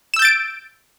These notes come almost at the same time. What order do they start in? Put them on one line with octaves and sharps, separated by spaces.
E7 E6 G6 A6 D7